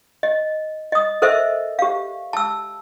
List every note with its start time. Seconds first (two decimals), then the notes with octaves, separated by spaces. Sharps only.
0.23 D#5
0.92 D#5 D#6
1.22 A4 A#4 C5 D#5 E5
1.79 G4 F5
2.33 A5 E6